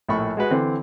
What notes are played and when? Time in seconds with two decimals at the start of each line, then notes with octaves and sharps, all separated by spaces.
0.09 A#1 A2 B5 C#6
0.37 G#3 F#4 B4 D#5
0.51 D3 E3 C4